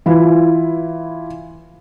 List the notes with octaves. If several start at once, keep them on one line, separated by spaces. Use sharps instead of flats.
E3 E4 F4